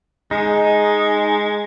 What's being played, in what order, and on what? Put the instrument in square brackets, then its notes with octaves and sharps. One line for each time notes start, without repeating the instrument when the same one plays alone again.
[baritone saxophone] G#3 [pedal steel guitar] D#4